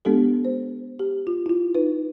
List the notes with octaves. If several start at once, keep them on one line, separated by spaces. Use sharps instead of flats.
G#3 B3 D4 G4 A4
C5
G4
F4
E4 F4
D#4 B4